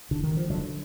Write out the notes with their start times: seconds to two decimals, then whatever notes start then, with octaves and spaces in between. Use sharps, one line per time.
0.11 D3
0.24 D#3
0.37 F3
0.50 D3 F#3